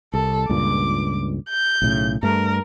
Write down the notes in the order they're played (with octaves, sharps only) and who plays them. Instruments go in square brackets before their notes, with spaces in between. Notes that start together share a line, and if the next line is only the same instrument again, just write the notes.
[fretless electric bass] C2 [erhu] A4
[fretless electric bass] C#2 G2 A#2 [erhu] D6
[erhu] G6
[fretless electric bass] B1 A2 C#3
[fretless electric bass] G2 A3 [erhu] A#4